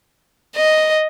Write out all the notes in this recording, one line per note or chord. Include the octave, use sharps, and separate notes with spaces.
D#5